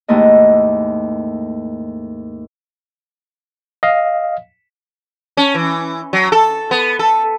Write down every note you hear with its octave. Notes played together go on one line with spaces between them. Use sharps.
D#2 G#2 A3 A#3 E4 D#5
D#5 F5
C#4
E3
F#3
A4
B3
A4